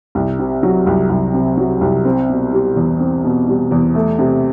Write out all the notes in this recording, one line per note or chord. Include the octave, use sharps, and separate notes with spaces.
C2
C3
F#3
C2
C2
C3
F#3
C2
C4
B2
G3
E2
C4
B2
G3
E2
A3
C3